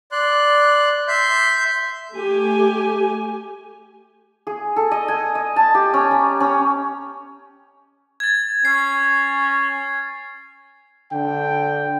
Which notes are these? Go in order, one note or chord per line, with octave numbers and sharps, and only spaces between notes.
D5 C6 F#6
E5 C6 G6
A3 G4 G#5
G#4
A4
D#5
G#5
D#5
A5
G4
C#4
A#5
C#4
G#6 A6
C#4 C7
D3 G5